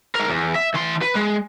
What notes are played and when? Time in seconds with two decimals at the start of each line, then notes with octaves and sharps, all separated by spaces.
0.15 G#3 A#4
0.29 E2
0.56 E5
0.75 E3 C6
1.03 B4
1.16 G#3